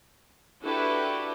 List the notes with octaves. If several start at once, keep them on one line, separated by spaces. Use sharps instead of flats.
D4 E4 F#4 G4 A4 B4